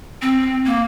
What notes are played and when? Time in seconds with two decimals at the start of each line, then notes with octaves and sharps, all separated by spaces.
0.22 C4
0.66 A#3